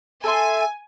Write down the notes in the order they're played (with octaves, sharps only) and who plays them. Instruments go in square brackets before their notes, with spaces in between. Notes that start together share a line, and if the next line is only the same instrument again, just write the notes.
[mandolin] A4 E5 C6 [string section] G#5